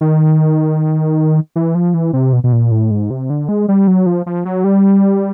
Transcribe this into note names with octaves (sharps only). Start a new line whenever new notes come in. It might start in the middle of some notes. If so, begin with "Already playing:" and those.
D#3
E3
F3
E3
C3
B2
B2
A#2
A2
G#2
C3
D3
G#3
G3
F#3
F3
F3
F#3
G3